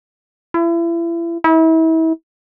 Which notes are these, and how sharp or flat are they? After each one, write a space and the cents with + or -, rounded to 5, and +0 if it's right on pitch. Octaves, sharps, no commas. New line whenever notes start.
E4 +35
E4 -35